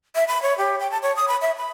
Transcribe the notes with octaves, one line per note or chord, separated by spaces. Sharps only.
E5
B5
C#5
G4
G5
A5
C#5
D#6
B5
E5
B5